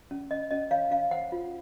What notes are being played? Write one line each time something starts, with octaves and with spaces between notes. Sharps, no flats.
C#4
C#4 D#5
C#4 D#5
C#5 F5
C#4 F5
C5 F#5
F4